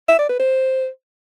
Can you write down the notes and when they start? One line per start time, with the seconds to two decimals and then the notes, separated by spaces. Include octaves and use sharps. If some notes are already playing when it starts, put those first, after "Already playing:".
0.09 E5
0.19 D5
0.29 B4
0.40 C5